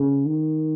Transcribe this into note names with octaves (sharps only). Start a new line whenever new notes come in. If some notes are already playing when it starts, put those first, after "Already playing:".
Already playing: C#3
D#3